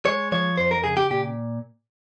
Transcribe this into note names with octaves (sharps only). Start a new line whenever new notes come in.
G#3 C#5
F3 C#5
F2 C5
A#4
C#3 G#4
G4
A#2 G4